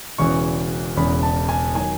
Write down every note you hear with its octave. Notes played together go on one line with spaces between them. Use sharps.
E1 E2 C#3 E3 C#6
E1 E2 C#3 E3 B5
A5
G#5
D#3 F#3 G#5